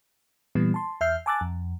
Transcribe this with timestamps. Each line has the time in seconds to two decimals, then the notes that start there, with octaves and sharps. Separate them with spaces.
0.55 A#2 E3 G3 B3
0.74 A5 C6
1.01 E2 E5 F6 G6 C7
1.26 G#5 A5 D6 E6 F#6 A6
1.41 F2